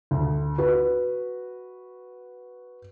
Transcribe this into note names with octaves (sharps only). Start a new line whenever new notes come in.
D2
F#4 B4